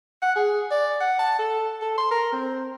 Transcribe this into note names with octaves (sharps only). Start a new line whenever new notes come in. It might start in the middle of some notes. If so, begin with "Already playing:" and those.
F#5
G#4
D5
F#5
A5
A4
A4
C6
A#4
C4